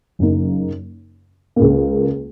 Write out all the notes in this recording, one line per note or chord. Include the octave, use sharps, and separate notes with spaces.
F#1 F#2 C#3 A#3 D#4
C#2 C#3 A#3